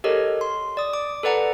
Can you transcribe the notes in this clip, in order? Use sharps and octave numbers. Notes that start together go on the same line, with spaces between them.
G4 A4 A#4 C#5 D#5
C6
D5 D#6
D6
A4 B4 D5 F#5 A#5